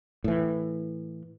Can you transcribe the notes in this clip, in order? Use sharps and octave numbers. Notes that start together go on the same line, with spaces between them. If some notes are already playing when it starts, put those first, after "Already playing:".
A2 E3